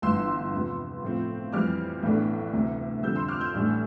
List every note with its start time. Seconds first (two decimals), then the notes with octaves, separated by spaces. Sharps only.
0.02 G1 G2 E3 C6 E6
0.52 E2 C3 F3 B3
1.02 A2 F3 C4
1.52 F2 E3 G3 C4 D6 F6
2.03 B1 A2 E3 A3 D4
2.53 D2 C3 E3
3.03 F2 D3 G3 C4 E6 G6
3.15 C6 E6
3.28 D6 F6
3.40 E6 G6
3.53 A1 A2 G3 D4